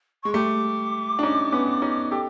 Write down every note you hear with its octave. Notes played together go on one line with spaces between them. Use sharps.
G#3 C#6
G3 A3 D6
D4
C#4 D#4
B3 C#4
C#4 D#4
G4 A4